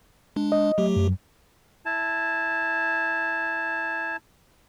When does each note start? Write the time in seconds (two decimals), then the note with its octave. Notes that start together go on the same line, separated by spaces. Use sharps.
0.36 G#3 D4
0.52 D#5
0.78 F#3 A3 G4
0.96 F#2
1.85 E4 A5